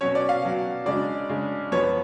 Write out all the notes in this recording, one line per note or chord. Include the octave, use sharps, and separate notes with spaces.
B2 F#3 C#4 C#5
D5
F5
B2 F#3 C#4
C#3 G#3 D4 D5
C#3 G#3 D4
F#2 F3 B3 C#5